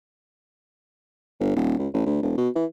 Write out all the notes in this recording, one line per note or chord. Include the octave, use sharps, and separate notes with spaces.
G1
D#1
C#2
A1
D2
E1
B2
E3